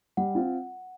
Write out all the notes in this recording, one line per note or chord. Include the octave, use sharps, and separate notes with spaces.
G3 F#5
C4 F4